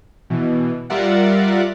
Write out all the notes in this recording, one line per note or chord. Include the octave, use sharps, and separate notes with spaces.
B2 E3
G3 F4 A#4 D5 E5 F#5